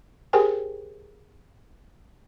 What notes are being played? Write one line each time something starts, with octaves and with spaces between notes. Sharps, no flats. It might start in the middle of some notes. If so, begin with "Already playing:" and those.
G4 G#4 A#4 C5 G5 G#5